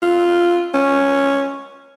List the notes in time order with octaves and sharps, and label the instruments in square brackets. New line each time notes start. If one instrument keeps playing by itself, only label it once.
[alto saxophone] F4
C#4